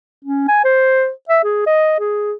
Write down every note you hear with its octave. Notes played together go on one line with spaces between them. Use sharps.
C#4
G#5
C5
E5
G#4
D#5
G#4